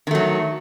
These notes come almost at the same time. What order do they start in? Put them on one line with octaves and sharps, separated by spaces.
D#3 A3 F#3